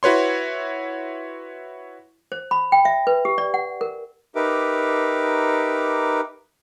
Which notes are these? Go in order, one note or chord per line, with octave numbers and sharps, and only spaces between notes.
E4 F#4 B4 C#5 C6
C5
B5
G5
E5
B4
G4
D5
F#5
A#4
D#4 G4 A#4 B4 E5 D6